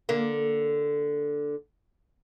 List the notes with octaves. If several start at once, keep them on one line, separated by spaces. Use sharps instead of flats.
D3 A#3